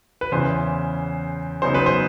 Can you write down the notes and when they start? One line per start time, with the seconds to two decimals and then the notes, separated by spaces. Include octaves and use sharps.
0.21 B4
0.32 E2 C#3 E3 C5
1.62 C#3 F#3 B3 D#4 C5
1.74 B4
1.86 C5